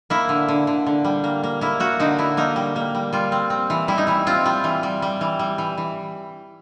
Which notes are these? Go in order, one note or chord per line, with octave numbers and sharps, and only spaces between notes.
A#3 E4
D3
D3
D3
D3
G3
A#3
A#3
A#3 E4
A#3 F#4
D3 D#4
D3 E4
A#3 D#4
G3
A#3
G3
G3 F4
C4
C4
E3
G3 E4
D#4
E3 E4
C4 F4
G3 F4
E3
G3
G3
E3
G3
E3
E3